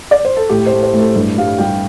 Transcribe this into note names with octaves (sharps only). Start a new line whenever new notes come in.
D5
C5
A4
A2 G4
C5
A3
C5
A2
A4
G2
G3 F5
G3 G5